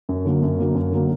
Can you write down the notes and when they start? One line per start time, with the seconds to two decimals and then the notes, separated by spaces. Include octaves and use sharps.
0.09 F#2
0.25 D3 F#3 A#3
0.42 F#2
0.58 D3 F#3 A#3
0.75 F#2
0.92 D3 F#3 A#3